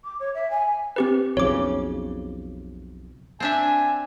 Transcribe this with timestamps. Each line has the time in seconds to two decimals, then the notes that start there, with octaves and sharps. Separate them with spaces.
0.04 D6
0.20 C#5
0.34 E5
0.50 G#5
0.96 C4 G4 B4
1.37 B1 F2 C#3 C#5 D6
3.40 C4 D4 E5 G#5